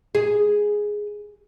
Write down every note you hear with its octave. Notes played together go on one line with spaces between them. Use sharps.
G#4